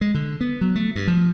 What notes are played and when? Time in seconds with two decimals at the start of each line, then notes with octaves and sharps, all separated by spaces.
0.01 G#3
0.14 D3
0.41 B3
0.61 F#3
0.75 A3
0.95 G2
1.08 F3